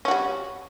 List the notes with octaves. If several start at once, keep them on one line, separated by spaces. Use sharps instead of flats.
G3 C#4 F#4